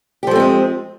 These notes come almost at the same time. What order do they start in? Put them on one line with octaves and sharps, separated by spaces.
G4 F3 A3 C4 G#3